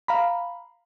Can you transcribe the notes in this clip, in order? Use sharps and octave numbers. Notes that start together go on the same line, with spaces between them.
F5 A#5 B5